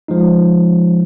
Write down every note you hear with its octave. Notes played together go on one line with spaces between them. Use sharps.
F3 G#3 D#4